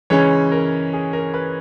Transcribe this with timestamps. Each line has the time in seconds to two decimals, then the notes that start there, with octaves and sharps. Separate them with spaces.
0.10 C#3 E3 G#3 C#4 C#5
0.52 A#4
0.93 G#4
1.13 A#4
1.34 B4